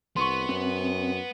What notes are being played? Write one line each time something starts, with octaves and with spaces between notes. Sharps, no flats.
C2 B3 C6 C#6
F#2 C4